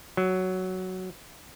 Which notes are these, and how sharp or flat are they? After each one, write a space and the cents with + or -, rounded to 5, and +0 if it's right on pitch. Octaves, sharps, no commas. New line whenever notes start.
F#3 +5